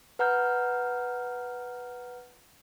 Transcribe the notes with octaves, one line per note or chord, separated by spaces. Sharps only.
B4 F#5 A#5 F6 G6